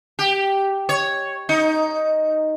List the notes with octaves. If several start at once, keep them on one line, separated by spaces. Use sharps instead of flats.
G4
C#5
D#4